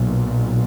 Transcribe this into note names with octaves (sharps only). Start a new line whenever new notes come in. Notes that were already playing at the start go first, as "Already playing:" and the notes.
Already playing: B1 A#2